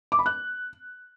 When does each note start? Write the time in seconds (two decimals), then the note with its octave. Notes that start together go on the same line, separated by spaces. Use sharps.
0.12 D6
0.19 B5
0.26 F#6